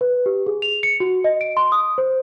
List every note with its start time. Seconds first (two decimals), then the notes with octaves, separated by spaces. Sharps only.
0.01 B4
0.26 G4
0.46 G#4
0.62 F7
0.83 C#7
1.00 F#4
1.24 D#5
1.41 D7
1.57 C6
1.72 D#6
1.98 C5